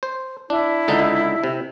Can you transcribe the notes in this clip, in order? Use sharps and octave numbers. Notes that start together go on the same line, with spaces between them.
C5
D4 E4
C#2 D3 D#4
C3